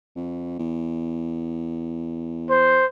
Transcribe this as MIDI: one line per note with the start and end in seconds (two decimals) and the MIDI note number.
0.16 0.57 41
0.59 2.83 40
2.50 2.86 72